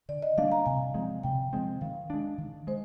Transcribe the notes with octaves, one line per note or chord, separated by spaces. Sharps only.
D3 D5
D#5
G3 A#3 D4 F5
A#5
C3 G#5
F3 G#3 C4
C3 G5
F3 G#3 C4
D#3 F5
G#3 D4
D#3
G#3 C5